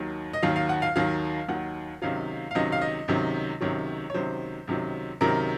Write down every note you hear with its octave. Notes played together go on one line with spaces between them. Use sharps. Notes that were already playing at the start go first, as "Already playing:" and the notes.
Already playing: D#2 D#3 F#3
D#5
D#2 D#3 F#3 F5
F5
F#5
F5
D#2 D#3 F#3 F5
D#2 D#3 F#3 F#5
C#2 C3 D#3 F#3 F5
F5
C#2 C3 D#3 F#3 D#5
F5
D#5
C#2 C3 D#3 F#3
C#2 C3 D#3 F#3 C#5
C#5
C#2 C3 D#3 F#3 C5
C#2 C3 D#3 F#3
C#2 C3 D#3 F#3 A#4